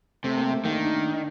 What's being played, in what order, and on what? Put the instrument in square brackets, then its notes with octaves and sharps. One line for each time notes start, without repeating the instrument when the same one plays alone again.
[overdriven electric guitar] C3 [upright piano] A3
[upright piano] A#3
A3
[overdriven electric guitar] D#3 [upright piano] A#3
[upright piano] D4
D#4
D4